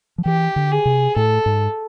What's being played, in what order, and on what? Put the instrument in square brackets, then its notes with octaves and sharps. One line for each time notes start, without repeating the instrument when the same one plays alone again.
[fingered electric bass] F3
[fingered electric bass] E3 [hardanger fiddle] G4
[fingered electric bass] D3
[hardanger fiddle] G#4
[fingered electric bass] C3
[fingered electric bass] A2 [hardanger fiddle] A4
[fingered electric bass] G#2